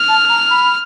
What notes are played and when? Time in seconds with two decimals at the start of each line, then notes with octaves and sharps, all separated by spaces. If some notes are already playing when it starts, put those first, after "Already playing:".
Already playing: F6
0.08 A5
0.29 A#5
0.50 B5